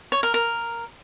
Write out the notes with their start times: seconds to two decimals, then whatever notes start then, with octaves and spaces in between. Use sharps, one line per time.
0.12 C#5
0.23 A#4
0.34 A#4